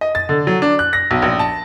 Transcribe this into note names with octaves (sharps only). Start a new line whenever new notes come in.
D#5
A6
D3
F#3
D4
F#6
A#6
B1
A#1
A5